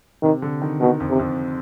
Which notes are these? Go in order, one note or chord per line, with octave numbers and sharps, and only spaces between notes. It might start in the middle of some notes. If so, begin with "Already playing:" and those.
C3 D#3
D3
D#3
B2 D#3
F2
C3
F2